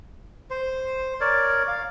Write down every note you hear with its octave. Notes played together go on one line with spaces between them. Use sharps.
C5
A#4 C#5 D5
F5